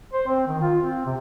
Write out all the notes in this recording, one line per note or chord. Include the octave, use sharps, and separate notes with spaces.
C5
C4
D#3
F4
C4
C3